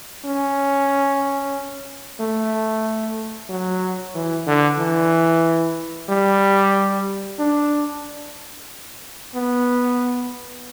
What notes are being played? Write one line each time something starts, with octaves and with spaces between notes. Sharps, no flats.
C#4
A3
F#3
E3
D3
E3
G3
D4
B3